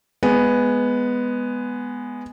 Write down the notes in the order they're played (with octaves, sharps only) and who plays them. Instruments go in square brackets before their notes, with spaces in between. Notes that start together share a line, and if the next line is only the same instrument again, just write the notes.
[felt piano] G#3 B3